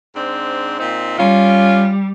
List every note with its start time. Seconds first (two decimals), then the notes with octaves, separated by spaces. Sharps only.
0.15 G#2 C4 D4
0.79 A#2 C4 D#4
1.17 G3 C#4 F4